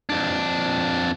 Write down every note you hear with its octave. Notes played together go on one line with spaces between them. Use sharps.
F2 D4